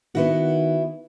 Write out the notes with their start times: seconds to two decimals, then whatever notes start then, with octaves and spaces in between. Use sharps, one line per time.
0.15 D#3 B3 E4 F#4